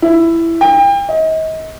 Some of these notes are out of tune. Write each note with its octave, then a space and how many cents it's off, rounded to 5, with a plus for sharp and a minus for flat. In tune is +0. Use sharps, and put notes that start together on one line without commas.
E4 +10
G5 +35
D#5 +35